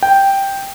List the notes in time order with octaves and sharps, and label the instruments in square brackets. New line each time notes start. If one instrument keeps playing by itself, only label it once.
[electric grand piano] G5